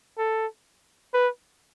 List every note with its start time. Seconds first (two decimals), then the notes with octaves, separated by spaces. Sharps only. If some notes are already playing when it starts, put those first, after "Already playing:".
0.18 A4
1.14 B4